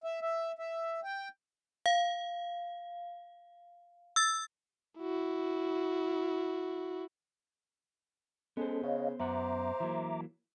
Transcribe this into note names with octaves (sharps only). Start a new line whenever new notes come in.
E5
E5
E5
G5
F5
E6 A6
E4 F#4
G#3 B3 C#4 A4 C5
C#3 C#5 D#5 F5
F#2 B3 C5 E5 F#5 A#5 D6
E3 F#3 A#3